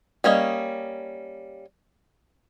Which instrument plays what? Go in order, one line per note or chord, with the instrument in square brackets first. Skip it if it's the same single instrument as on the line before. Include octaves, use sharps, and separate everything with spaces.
[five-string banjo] G3 A#3 C#4 D#5